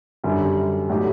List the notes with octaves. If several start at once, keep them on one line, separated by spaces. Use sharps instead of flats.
F#2 D3 G3
A2 F#3 A3 D#4 G4